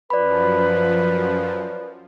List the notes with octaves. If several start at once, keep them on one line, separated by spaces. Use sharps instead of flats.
F#2 F3 B4 D5 B5